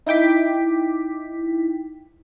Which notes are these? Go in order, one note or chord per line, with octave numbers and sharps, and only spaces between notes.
D#4 E4 G5 D6 B6